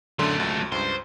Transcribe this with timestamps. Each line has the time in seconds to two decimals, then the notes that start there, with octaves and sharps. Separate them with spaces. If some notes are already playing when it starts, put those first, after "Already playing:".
0.19 F#2 D3 F#3 A3 C6
0.40 C#2
0.72 C#2 G2 C5